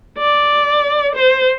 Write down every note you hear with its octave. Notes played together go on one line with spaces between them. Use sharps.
D5
C5